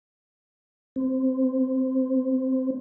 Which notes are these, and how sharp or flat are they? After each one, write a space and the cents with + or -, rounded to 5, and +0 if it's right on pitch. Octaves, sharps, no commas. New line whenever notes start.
C4 -5